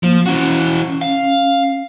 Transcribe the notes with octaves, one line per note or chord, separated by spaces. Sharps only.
F3 A#3
E3 C#4 F#4
F5